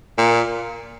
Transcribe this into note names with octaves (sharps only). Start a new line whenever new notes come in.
A#2